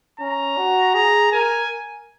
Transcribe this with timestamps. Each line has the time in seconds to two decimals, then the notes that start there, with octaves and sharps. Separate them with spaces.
0.20 C#4 A#5
0.58 F#4
0.95 G#4 A#5
1.32 A#4 G#5